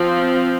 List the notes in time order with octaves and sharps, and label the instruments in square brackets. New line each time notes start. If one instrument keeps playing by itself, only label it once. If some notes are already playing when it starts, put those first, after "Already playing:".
Already playing: [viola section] F3 C4